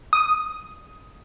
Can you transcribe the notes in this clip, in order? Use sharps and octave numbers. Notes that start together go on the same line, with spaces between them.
D#6